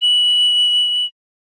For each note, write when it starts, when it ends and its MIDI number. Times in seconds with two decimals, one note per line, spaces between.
0.02 1.06 102